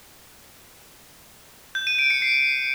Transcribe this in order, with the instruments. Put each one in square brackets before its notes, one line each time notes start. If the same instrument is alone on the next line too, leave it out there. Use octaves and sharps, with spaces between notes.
[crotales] G6
D#7
D7
C#7
C7